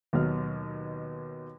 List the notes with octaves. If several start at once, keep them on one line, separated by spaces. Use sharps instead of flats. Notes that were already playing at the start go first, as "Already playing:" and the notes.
D#2 B2 F#3 F6